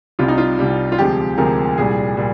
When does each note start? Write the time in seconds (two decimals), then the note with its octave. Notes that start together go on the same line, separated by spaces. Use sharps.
0.19 C2 C3 G3 F4
0.28 D#4
0.38 F4
0.59 C2 C3 G3
0.92 F4
0.98 D2 C3 F3 G#3 G4
1.37 D2 C3 F3 G#3 A#4
1.78 C2 A#2 G3 G#4
2.17 A#2 G3